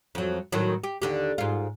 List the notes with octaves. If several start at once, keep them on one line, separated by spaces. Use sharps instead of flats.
F2 F#3
A2 D#3 F#3
G4
D#2 D3 G4
G#2 F4